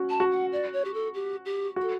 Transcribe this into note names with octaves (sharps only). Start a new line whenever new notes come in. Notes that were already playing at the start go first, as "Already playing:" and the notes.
Already playing: C#4 F#4
A5
F#4
F#5
D5
C#5
G4
A4
G4
G4
F#4
A4